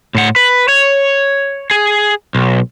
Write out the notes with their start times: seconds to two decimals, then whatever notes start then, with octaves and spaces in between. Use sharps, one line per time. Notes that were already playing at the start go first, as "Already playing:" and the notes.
0.15 A2 F#5
0.36 B4
0.68 C#5
1.71 G#4
2.35 B1